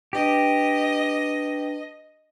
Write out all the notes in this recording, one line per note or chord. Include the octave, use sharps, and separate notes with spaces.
D4 G4 B4 D#5 A5